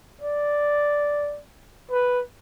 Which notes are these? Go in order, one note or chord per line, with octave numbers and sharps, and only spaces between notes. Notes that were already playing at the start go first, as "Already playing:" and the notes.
D5
B4